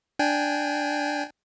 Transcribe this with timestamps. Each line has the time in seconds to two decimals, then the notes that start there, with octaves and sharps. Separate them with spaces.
0.19 D4 G5 G#5